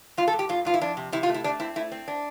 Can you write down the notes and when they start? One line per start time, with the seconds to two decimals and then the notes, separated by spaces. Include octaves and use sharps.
0.17 G2 F4
0.28 A4
0.33 G2
0.39 G4
0.49 G2 F4
0.65 G2 F4
0.74 E4
0.81 F2 D4
0.97 C3
1.12 C3 E4
1.23 F4
1.29 A3
1.34 E4
1.44 A3 D4
1.60 C4 E4
1.76 A3 E4
1.92 C4
2.08 D4